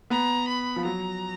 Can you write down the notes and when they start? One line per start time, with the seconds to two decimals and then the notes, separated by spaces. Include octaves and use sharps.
0.10 B3 A#5
0.48 B5
0.76 F3
0.85 F#3 A#5